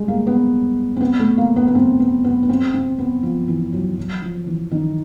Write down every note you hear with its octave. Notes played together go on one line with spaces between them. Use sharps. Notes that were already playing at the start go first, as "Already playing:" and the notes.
Already playing: G3 G#3
A#3
B3
C4
B3
A3
A#3
B3
B3
C4
B3
B3
B3
C4
C4
B3
F3
E3
F#3
F#3
F3
E3
D#3